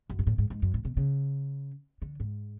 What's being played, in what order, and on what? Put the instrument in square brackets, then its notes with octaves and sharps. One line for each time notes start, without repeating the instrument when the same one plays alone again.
[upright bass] F#2
G#2
A2
G#2
G#2
F#2
A2
B2
C#3
D3
G#2